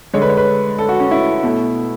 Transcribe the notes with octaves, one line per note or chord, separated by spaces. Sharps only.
D3 G#3 C#5
B4
C#5
B4
A4
F#4
C#4
E4
B2 A3